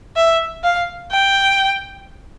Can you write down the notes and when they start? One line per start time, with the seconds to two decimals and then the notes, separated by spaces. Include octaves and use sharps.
0.16 E5
0.64 F5
1.11 G5